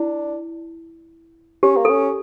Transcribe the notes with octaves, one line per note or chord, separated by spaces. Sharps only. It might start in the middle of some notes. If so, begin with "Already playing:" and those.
Already playing: D4 E4
C#4 G4
A#3
C#4 A4